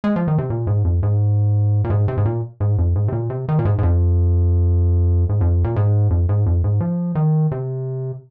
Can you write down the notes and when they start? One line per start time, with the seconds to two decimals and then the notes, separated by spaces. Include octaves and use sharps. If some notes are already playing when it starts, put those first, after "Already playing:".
0.04 G#3
0.16 F3
0.28 D#3
0.38 C3
0.50 A#2
0.67 G#2
0.85 F2
1.03 G#2
1.84 A#2
1.90 G#2
2.08 C3
2.17 G#2
2.25 A#2
2.60 G#2
2.78 F2
2.96 G#2
3.08 C3
3.12 A#2
3.30 C3
3.49 D#3
3.59 A#2
3.65 G#2
3.78 G#2
3.83 F2
5.29 G#2
5.41 F2
5.64 A#2
5.76 G#2
6.10 F2
6.29 G#2
6.46 F2
6.64 G#2
6.80 F3
7.15 D#3
7.51 C3